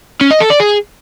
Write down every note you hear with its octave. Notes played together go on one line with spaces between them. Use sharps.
C#4
D#5
A4
D5
G#4